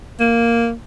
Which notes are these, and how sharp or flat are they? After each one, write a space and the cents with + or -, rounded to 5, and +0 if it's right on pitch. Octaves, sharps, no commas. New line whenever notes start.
A#3 -5